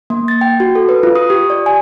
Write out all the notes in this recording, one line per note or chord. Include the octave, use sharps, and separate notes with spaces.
A#3
A6
G5
F#4
A4
B4
F4
D#6
G4
D5
G#5